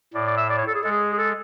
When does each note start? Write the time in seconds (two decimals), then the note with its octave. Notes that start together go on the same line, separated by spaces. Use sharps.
0.14 A2 D5
0.26 D5
0.37 E5
0.50 D5
0.58 C#5
0.67 A4
0.75 G#4
0.83 G#3 A4
0.91 G#4
1.13 G#4
1.18 A4